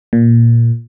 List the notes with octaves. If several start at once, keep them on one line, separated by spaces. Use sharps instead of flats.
A#2